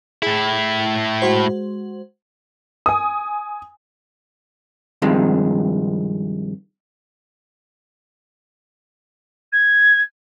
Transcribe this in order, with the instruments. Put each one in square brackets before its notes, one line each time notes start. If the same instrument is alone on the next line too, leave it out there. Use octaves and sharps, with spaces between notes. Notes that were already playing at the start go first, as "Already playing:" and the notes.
[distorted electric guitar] A2 E4 [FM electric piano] G#4
[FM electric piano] G#3 F#4 C5
[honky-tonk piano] G#5 D#6
[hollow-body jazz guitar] G2 C3 D#3 F3 G#3
[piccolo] G#6